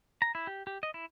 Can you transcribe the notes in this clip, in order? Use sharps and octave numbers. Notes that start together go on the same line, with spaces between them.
A#5
E4
G4
G4
D#5
E4